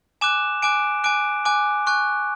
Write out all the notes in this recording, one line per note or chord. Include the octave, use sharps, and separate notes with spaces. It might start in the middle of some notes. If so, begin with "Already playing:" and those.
G#5 D6 F#6 E7
G#5 D6 F#6 D7
G#5 D6 F#6 D7
G#5 D6 F#6
G#5 C#6 F#6